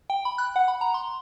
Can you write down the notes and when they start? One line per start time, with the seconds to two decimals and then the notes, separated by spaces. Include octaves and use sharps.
0.10 G5
0.25 B5
0.38 F#6
0.56 F#5
0.68 B5
0.81 A#5
0.94 C6